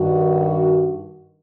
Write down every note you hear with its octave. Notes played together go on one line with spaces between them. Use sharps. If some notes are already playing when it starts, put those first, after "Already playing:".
Already playing: G2 D#3 F#4